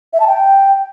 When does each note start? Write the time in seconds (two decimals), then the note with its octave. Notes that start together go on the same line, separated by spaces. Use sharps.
0.13 E5
0.20 A5
0.27 G5